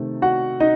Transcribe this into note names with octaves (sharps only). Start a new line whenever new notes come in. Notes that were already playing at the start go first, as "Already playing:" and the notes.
Already playing: C3 D#3 A3
F#4 F#5
D#4 D#5